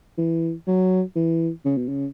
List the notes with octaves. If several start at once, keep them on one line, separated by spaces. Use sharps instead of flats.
E3
F#3
E3
C#3
B2
C#3